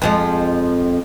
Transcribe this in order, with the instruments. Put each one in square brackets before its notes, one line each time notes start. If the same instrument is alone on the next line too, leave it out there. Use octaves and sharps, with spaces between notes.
[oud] F2 F3 G#3